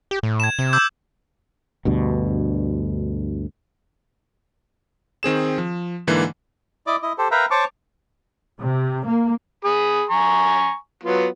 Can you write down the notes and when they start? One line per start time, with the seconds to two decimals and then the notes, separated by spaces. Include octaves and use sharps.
0.11 G4
0.23 A2
0.40 G#6 E7
0.59 C3
0.73 D6 E6 G6
1.85 D2 G2 B2
5.23 D#3 C4 G#4 E7
5.58 F3
6.07 G#2 D3 E3 A#3
6.87 E4 D5 D#5 D6
7.02 E4 D#5
7.18 G4 A4 C5
7.31 A#4 B4 E5 F5 G5 A#5
7.51 C5 C#5 A5 C#6 D6
8.58 C3
9.06 A#3
9.64 G#4 B5 D#6
10.09 G#5 A#5 C#6
11.04 F#3 B3 F4